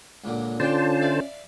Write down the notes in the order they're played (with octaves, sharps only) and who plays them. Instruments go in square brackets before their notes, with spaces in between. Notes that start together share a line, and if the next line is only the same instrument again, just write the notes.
[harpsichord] C#2 A#2 D3
[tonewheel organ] D3 C5 A5 [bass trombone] C#4 [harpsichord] D4 G5 [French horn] F4
[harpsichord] D5 E5 F5